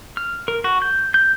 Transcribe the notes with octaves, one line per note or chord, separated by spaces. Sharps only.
F6
A#4
F#4
G6
G6